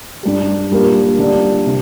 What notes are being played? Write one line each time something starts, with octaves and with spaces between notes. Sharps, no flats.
G2 G3 D4 G4
A#2 G3 D4 F4 A#4
D3 G3 D4 F4
C3